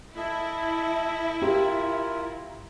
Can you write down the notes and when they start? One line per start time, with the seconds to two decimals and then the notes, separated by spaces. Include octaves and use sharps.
0.17 E4 A4 D#5
1.42 F4 G4 A#4